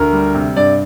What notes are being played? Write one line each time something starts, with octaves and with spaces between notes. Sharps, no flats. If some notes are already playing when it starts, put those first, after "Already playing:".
Already playing: D2 A#4
G3
C3
G2 D5